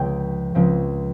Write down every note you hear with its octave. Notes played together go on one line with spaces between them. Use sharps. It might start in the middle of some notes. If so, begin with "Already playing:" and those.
Already playing: C#2 C#3 F3 C4 G5
C#2 C#3 F3 C4